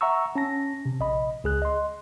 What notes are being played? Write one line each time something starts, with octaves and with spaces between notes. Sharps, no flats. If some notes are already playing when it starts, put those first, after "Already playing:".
E5 F#5 A#5 C#6 E6
C#4 A5 A#6
C3
A#1 D#5 B5
C#2 G#4 F#6
D#5 C6